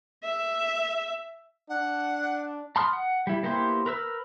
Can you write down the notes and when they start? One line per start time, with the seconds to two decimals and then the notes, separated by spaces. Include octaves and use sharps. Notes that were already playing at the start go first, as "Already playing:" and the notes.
0.24 E5
1.69 D4 F#5
2.76 A5 B5 C6 D#6 F6
2.93 F#5
3.27 G3 E4
3.43 A#3 B3 E4 G4 C5
3.86 A#4 B4 E6 F6